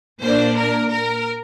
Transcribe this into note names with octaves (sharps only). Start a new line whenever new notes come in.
A#2 A#3 D4 C5
A#4
A#4